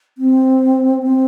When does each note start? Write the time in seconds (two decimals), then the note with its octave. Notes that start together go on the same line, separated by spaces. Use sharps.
0.18 C4
1.03 C4